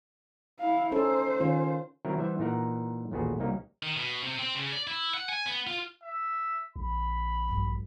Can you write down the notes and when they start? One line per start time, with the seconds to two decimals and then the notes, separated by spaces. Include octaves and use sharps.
0.59 E4 F5
0.92 C#4 D#4 A4 C5
1.40 D#3 C#4 F4
2.05 D#3 F#3 C4 E4 A#4
2.18 E3 G3 C5 E5 F#5
2.39 A#2 E3 D#4 A#4 F#5
3.11 A1 D#2 A#2 B3 F#4 G#4
3.39 C2 F#3 A#3 D#4 G4
3.83 D#3
3.96 B2
4.23 C3
4.39 C4
4.55 C#3
4.72 D5
4.87 E4
5.14 F#5
5.29 G#5
5.46 B3
5.67 F4
6.03 E5
6.76 A#1 B5
7.48 D2 G2